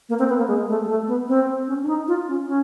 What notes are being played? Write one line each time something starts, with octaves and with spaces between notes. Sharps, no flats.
A#3
C4
B3
A#3
G#3
A3
G#3
A3
B3
C4
C#4
D4
D#4
F4
C#4
C#4